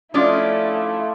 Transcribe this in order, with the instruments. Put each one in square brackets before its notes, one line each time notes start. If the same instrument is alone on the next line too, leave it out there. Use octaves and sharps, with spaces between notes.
[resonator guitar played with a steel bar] F3 C#4 D4 [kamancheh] A3 E4 [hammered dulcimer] F4 D5 D#5